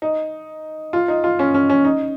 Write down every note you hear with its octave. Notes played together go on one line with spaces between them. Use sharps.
D#4
F4
D#4
F4
C#4
C#4
C#4
D#4